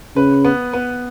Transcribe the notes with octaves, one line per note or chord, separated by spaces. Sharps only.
C#3 B4
B3
B3